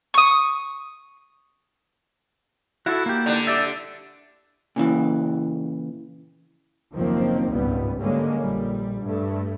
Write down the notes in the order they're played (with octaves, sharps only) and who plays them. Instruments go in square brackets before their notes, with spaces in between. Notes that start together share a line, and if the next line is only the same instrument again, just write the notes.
[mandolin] C#6 D#6
[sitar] E4 [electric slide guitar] F#4 A4
[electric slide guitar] A#3 G4
[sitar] D3 D4
[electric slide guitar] G4 D5 E5
[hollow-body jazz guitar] A#2 C#3 E3
[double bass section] F#1 D#2 D#3 F3 A#3 C4
G#1 C#2 G2 A#2 G3 B3
D3 G3 G#3 A#3 C#4
A#1 G3
G2 A3